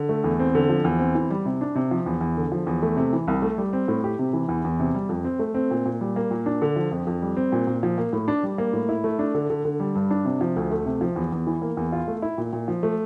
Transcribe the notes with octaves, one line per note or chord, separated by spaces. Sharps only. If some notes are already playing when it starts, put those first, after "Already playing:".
Already playing: D3
A3
E2
C4
D3
F3
E2
C4
E3
G3
C3
D4
C3
F3
E2
E2
D3
F3
E2
A3
C3
E3
C2
A3
G3
C4
A2
G4
C3
E3
E2
E2
C3
G3
F2
C4
A3
C4
A#2
A#2
G3
A#3
A#2
D4
D3
F3
F2
F2
G3
C4
A#2
A#2
F3
A#3
A2
D4
G3
A#3
A2
E4
A3
D4
D3
D3
D3
G3
G2
D4
C3
F3
D2
A3
C3
F3
E2
E2
E3
A#3
E2
F4
A3
E4
A#2
A#2
F3
A3